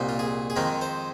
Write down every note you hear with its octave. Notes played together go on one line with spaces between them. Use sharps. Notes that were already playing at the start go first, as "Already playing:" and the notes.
Already playing: C2 A#2 A#3 D#4
F4
G#4
G#4
F2 D#3 G#3 D#4 A#4
C5